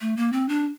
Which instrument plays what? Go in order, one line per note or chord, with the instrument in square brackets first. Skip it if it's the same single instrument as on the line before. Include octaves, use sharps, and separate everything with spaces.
[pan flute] A3
A#3
C4
D4